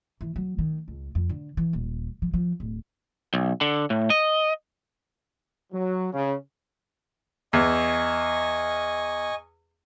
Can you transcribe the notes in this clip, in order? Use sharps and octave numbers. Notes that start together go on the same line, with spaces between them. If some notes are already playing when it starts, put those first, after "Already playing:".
E3
F#3
D#3
C#2
F2
D3
E3
D#1
F3
F3
D1
B1
D3
A2
D#5
F#3
C#3
E2 D#5 G#5 C#6